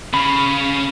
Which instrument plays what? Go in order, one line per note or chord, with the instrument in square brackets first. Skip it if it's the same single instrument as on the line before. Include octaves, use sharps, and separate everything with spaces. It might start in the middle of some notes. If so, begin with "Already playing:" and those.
[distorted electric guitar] C#3 [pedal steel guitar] B5